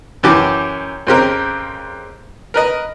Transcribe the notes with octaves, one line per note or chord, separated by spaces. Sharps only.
F#2 E3 G4 D6
F2 C#3 C4 G4 A#4
A#4 B4 D#5